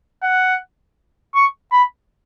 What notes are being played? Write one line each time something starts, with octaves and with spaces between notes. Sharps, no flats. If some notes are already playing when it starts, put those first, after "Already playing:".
F#5
C#6
B5